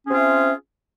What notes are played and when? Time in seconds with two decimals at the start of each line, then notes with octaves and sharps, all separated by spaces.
0.05 C#4
0.07 G#4
0.10 C4
0.13 F4
0.16 E5